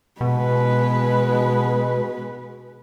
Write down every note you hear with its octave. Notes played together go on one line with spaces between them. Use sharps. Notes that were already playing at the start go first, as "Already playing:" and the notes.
B2 G#3 B4